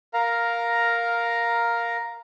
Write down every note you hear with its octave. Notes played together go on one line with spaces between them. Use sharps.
A#4 F5 A#5